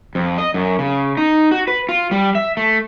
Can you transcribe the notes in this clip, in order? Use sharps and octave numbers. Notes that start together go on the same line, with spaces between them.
F2
D#5
F#2
C#3
D#4
F#4
B4
F4
G3
E5
A3